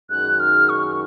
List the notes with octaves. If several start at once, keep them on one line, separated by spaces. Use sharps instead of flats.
F#2 D#3 G#3 D#4 G#4 F#6
F6
C#6